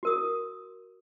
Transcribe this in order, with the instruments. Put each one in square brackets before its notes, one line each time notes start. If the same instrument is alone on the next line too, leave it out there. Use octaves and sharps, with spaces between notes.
[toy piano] F#4 A#4 D#6